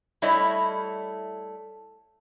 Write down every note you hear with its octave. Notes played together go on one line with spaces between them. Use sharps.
G3 A3 E4 C#5 D#5